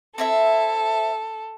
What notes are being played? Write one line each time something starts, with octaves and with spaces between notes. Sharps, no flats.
C4 E4 A4 E5